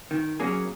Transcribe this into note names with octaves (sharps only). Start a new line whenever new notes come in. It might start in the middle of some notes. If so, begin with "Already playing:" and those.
D#3
F#3 A#3 C#4 G#4